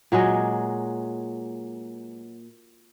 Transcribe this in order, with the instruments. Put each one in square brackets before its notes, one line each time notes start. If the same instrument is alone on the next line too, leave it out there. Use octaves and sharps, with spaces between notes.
[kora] A#2 F#3 G#3 D#5